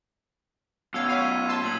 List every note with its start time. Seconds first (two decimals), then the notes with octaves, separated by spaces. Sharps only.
0.94 F#2 B2 F5 E6 G#6
1.09 C#5 F5 B6 D#7
1.48 A5 C6 E6
1.64 A#2 G#6 C7 F#7